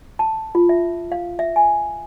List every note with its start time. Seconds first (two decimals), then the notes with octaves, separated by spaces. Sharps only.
0.19 A5
0.55 F4
0.69 E5
1.12 F5
1.39 E5
1.56 G#5